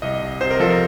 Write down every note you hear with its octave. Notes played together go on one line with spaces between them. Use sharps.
C2 D#5
C2
C3 C5
A#4
F3 A4
A#4